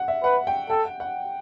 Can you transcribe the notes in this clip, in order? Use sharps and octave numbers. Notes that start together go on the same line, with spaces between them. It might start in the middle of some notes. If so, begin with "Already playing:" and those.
Already playing: F#5
E5
B4 F#5
G5
A4 G5
F#5
F#5